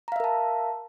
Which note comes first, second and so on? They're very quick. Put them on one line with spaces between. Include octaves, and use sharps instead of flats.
A#5 F5 E5 A#4 A5